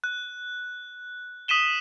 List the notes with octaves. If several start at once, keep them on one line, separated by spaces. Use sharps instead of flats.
F#6
D#6 B6 D#7 E7 G7